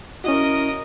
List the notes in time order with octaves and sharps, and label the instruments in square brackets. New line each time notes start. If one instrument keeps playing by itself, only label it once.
[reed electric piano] C#4 E4 F#4 [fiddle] A#4 D#5